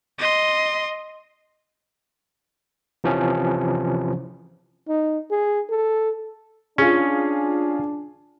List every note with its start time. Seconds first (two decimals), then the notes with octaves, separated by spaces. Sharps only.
0.19 D#5 C6
3.04 C3 E3 F3 C#4
4.89 D#4
5.31 G#4
5.70 A4
6.78 C#4 D4 F4 G#4